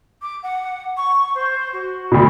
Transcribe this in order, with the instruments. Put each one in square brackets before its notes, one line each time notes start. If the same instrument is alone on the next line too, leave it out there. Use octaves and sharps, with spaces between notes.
[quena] D6
F#5
C#6
C5
F#4
[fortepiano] D2 B2